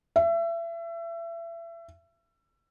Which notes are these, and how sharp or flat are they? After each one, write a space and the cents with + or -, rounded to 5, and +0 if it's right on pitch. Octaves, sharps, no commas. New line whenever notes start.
E5 +30